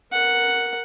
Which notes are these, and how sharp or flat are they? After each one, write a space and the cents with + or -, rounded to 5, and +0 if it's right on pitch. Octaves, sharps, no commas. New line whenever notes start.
A#4 +0 F#5 +0